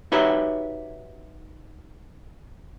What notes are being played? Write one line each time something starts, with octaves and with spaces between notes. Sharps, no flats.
D#4 F#4 G4 B4 C#5 E5